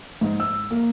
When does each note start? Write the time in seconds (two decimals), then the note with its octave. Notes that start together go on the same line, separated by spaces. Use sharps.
0.21 G#2
0.40 E6
0.71 A#3